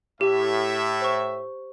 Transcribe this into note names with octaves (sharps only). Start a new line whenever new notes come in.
A2 G4 E5
C5 C#6